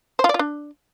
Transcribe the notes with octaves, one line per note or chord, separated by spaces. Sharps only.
C5
F4
D5
F4
D4